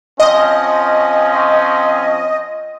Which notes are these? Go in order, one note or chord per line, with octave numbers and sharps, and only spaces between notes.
F3 C4 C#4 D#5